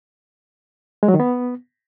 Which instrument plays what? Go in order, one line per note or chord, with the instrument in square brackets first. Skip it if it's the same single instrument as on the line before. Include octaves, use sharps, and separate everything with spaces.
[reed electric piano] G#3
F#3
D#3
B3